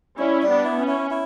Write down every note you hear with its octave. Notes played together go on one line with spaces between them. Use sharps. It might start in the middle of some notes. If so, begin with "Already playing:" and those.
G3 C#4 E4
G3
B3 D4
E4
C#4
E4
E4